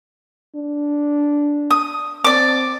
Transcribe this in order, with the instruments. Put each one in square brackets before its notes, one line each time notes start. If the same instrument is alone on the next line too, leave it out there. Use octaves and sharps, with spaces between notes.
[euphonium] D4
[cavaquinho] D#6
[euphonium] C4 [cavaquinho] D5 D6